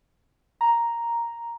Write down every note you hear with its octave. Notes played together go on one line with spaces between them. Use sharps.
A#5